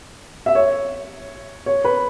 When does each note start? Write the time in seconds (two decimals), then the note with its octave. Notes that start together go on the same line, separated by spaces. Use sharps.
0.46 E5
0.55 C#5
1.66 C#5
1.84 B4